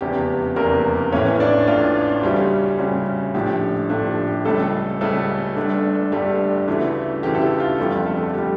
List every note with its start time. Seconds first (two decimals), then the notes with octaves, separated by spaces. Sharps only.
0.01 F1 E2 C#3 G4
0.56 F1 E2 C#3 A#3 A#4
1.12 A1 A2 E3 C#4 C#5
1.40 D4 D5
1.67 A1 A2 E3 F4
2.23 D2 C#3 G3 C#4 G4
2.78 D2 C#3 G3 C#4
3.34 A#1 A2 F3 A3 D4 G4
3.89 A#1 A2 F3 A3 D4 G4
4.27 G4
4.45 C#2 C#3 G3 A3 C#4 A4
5.01 C#2 C#3 G3 A3 C#4 A4
5.56 G1 G2 D3 A3 D4
6.12 G1 G2 D3 A3 D4 G4
6.67 D2 C#3 E3 A3
7.23 D2 C#3 E3 A3 G4
7.35 A4
7.42 G4
7.60 F4
7.79 G1 F2 D3 G3 G4
8.06 A3 A4
8.34 D3 G3 G4